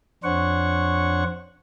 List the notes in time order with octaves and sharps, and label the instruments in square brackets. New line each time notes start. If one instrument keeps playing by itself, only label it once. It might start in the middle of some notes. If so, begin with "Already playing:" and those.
[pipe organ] F2 D4 C5 C#5 F#5 C#6